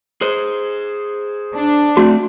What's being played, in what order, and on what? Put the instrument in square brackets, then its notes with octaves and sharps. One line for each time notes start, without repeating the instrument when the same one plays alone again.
[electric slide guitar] G#4 C5
[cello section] D4
[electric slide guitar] A3 C4 [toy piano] F#4